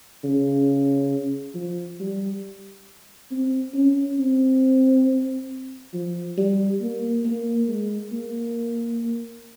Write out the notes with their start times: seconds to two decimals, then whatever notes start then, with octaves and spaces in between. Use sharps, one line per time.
0.24 C#3
1.55 F3
2.00 G3
3.31 C4
3.74 C#4
4.19 C4
5.93 F3
6.37 G3
6.81 A#3
7.25 A#3
7.68 G#3
8.12 A#3